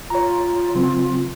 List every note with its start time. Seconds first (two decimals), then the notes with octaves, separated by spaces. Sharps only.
0.10 F4 C#5 A#5
0.75 C#3 F#3 C4